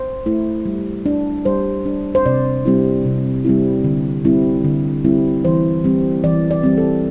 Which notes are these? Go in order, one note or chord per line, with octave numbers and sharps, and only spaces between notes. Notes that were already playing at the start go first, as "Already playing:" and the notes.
Already playing: C5
A3 E4
G3
D4
G3 C5
D4
C5
C3 D5
G3 C4 E4
C3
G3 C4 E4
D3
G3 C4 E4
D3
G3 C4 E4
E3 C5
G3 C4
E3 D5
D5
G3 C4
A4